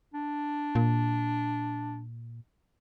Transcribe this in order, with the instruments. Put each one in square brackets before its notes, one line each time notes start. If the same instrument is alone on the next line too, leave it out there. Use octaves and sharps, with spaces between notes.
[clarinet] D4
[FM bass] A#2